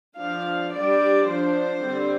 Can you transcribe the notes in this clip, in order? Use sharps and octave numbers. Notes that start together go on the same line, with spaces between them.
F3 D4 F5
G3 D4 D5
F3 D4 C5
D3 G3 C4